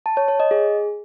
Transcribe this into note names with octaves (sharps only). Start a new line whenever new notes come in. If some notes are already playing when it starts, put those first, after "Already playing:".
A5
C#5
C#5
D#5
G#4